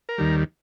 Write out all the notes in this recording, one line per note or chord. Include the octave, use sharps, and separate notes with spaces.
A#4
D#2 D#3 G3